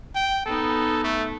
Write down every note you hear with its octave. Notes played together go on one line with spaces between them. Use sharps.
G5
B3 D#4 A4
A3